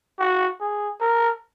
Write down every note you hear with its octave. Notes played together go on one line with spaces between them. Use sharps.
F#4
G#4
A#4